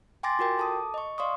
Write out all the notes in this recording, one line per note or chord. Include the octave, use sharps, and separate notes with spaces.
G5 G#5 C6 D6 A6 A#6
F4 F#4 A#4 G5
A4 A5 D6 D#6
D#5 C#6
D5 F5 C6 C#6 D#6